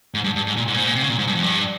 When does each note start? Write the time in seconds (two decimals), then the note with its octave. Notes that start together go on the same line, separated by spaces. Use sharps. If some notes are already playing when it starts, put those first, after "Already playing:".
0.14 G#2
0.24 G2
0.36 G2
0.47 G#2
0.57 A#2
0.67 G#2
0.74 A#2
0.78 G#2
0.87 A#2
0.95 C3
1.02 C#3
1.10 A#2
1.19 G#2
1.27 G2
1.35 F2
1.43 G2